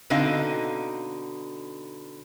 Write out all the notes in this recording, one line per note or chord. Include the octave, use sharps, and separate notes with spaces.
B2 D3 C4 D#4 D#5 F5